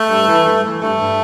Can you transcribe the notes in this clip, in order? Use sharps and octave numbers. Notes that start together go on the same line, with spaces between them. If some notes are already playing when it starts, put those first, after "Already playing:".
Already playing: A3
G2
E3
G2
E3
G2 A3
G2